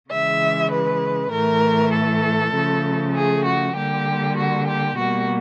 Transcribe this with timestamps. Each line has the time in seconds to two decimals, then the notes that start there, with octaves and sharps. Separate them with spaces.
0.10 C#3 E3 G#3 E5
0.71 B4
1.33 A2 E3 A3 A#4
1.93 A4
2.54 C#3 F3 A3
3.15 G#4
3.45 F#4
3.76 D3 G3 A#3 G4
4.37 F#4
4.67 G4
4.98 B2 G3 A#3 F#4